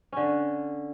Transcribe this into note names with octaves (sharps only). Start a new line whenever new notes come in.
D3 C#4